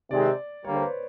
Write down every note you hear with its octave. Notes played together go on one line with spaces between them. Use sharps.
C3 D#3 G#3 C4 D5
D3 G3 A#3 C#5
C5
B4